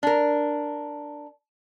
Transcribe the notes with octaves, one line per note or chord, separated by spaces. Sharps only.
D4 A#4